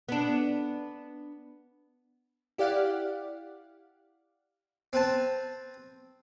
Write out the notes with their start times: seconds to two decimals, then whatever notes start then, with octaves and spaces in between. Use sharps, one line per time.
0.09 B3 D4
2.58 E4 G4 D5 F5 F#5
4.93 C4 B4 A5